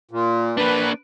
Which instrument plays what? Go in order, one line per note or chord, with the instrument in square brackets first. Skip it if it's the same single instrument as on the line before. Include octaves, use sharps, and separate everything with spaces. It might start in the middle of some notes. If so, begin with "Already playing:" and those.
[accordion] A#2
[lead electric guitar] A#3 D4 [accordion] B4